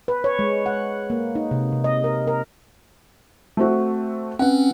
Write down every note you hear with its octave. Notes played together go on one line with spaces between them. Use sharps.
B4
C#5
G#3
F#5
A#3
D#4
C3
C3
D#5
A#4
A#4
A3 C4 F#4
C4 C#4 B4 F#5